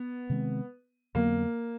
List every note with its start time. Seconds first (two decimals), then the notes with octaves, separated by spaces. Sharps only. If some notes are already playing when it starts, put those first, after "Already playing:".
Already playing: B3
0.30 C3 D#3 G#3 C4
1.15 F2 D3 F#3 A#3 B3